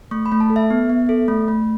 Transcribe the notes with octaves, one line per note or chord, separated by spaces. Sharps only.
A3 C#6
B5
A3
A5
A4
E5
B3
B3
A4
A3
A3